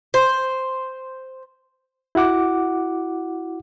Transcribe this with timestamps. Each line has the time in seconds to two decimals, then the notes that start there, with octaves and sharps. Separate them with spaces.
0.14 C5
2.15 E4 F#4 F#5 D6